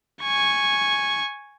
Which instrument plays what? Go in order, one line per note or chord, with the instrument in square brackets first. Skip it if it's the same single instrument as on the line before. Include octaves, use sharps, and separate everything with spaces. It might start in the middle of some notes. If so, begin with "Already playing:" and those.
[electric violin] G#5 C#6